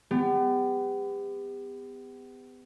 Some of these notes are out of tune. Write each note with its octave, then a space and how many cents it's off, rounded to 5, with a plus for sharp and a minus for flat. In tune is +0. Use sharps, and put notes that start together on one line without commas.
B3 +35 G4 +40